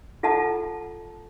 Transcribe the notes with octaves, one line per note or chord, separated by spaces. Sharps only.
F4 A4 F#5 A5 A#5